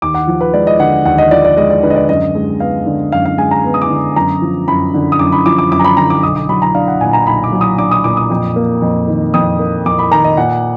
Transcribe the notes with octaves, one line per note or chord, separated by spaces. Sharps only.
D#2 D6
F#5
F3
B4
G#3 D5
D#5
D3 F#5
D#2 F#5
D#5
F3 D5
D5
G#3 D#5
D5
D3 B4
D#5
D5
F#2 D#5
G#3
B3 F5
D3
F#2 F5
F5
G#3 G#5
A#5
B3
D#6
D6
D3
F#2 A#5
F3
F#2 B5
D3
D#6
F#2 D6
B5
F3 D6
D6
F#2 D6
A#5
B5
D3 A#5
D6
B1 D#6
D6
F#3 B5
A#5
D4 F5
F#5
A#2 G#5
A#5
B1 B5
D6
F#3
D#6
D4 D6
D#6
A#2 D6
D#6
F2
A#3
F2
D#3
F2 D#6
A#3
F2 D6
B5
D#3 A#5
D#5
A#2 F#5